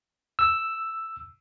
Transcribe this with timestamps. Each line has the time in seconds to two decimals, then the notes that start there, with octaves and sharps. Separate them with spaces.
0.39 E6